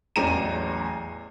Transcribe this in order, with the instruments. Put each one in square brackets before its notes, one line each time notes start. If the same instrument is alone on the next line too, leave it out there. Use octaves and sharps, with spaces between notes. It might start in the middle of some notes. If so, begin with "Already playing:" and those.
[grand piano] A1 E2 F#3 G#4 A#5 D#7